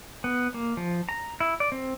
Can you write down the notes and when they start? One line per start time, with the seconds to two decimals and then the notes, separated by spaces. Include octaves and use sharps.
0.24 B3
0.54 A#3
0.77 F3
1.09 A#5
1.40 E4
1.60 D5
1.72 C4